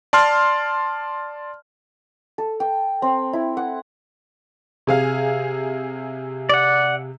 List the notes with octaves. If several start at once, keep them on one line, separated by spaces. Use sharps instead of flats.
D5 A5 C6 F6
A4
G5
C4
E4
F#5
C3 G#4 F5
D5 F#5